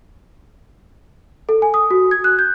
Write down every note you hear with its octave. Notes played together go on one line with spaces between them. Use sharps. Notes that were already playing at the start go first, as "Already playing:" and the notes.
A4
G#5
D#6
F#4
G#6
F#6
G6